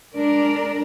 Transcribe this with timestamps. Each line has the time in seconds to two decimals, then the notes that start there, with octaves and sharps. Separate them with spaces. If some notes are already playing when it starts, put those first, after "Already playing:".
0.15 G#3 D4 A#4 D5